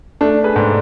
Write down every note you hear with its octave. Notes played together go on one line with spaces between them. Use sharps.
A3 D4
G#4 B4
G#2